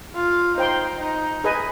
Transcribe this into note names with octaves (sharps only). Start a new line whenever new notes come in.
F4
D#4 C5 G5 C6
D#4
G#4 B4 D#5 G#5